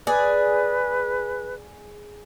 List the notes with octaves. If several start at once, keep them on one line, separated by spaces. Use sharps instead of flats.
G#4 B4 D5